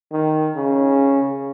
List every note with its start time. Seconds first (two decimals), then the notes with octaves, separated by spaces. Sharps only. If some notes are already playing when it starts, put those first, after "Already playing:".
0.12 D#3
0.56 C#3